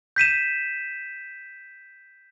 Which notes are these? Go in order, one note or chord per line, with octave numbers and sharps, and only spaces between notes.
G6 B6 D#7 E7